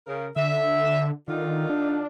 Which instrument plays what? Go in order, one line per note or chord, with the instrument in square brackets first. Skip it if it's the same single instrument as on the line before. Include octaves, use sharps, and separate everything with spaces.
[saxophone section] C#3 A#4
[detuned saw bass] D3 [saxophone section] E5
[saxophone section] D3 D#4 F4 [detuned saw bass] D#3
[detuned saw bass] D4